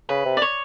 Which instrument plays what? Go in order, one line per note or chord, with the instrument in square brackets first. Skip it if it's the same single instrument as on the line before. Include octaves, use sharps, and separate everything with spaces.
[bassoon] C#3 [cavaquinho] B4
[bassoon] C3
[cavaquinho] D5
C#5